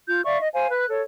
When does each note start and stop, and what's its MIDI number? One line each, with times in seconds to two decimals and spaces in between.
0.07 0.25 65
0.07 0.25 91
0.25 0.37 74
0.25 0.37 76
0.25 0.37 77
0.25 0.37 85
0.39 0.48 75
0.54 0.67 72
0.54 0.67 77
0.54 0.67 80
0.71 0.86 71
0.71 0.86 90
0.89 1.02 69
0.89 1.02 73